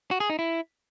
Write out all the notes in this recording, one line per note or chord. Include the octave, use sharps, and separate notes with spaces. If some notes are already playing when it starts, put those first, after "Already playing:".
F#4
G#4
D#4
E4